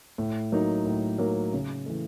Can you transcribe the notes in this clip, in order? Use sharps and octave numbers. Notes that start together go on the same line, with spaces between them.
A2
F#3 A#3 D#4
A2
F#3 A#3 D#4
C#3
E3 A3